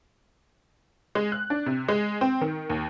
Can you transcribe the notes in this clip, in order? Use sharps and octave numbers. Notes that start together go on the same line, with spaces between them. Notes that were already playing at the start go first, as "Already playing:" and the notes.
G#3
F#6
D4
C3
G#3
C4
D#3
D#2